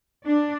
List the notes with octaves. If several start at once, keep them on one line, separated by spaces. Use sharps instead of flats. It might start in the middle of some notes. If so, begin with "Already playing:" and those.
D4